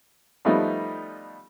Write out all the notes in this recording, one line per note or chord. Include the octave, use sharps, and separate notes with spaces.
F3 G3 A3 B3 D#4